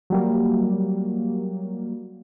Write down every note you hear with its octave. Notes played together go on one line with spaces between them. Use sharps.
F#3 G3 A#3